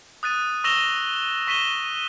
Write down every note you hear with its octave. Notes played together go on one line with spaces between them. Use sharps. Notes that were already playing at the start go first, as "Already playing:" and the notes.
D#6 F#6 A6 D#7
C#6 E6 A#6 E7 F7 G7
C#6 B6 D#7 E7 G7